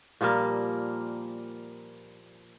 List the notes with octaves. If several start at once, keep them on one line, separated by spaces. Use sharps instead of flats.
A#2 F3 G3 A#3